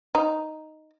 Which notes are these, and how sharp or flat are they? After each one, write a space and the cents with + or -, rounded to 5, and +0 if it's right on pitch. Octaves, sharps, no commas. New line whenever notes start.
D#4 +0